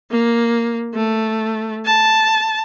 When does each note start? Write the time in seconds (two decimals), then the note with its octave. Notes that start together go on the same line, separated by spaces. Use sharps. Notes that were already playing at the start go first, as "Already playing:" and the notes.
0.11 A#3
0.95 A3
1.85 A5